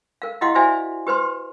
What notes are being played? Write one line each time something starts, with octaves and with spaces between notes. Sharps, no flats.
A#4 F5
E4 G4 D#5 F5 F#5 C6
F#4 C5 D5 E5 F5 G#5
G4 B4 C5 C6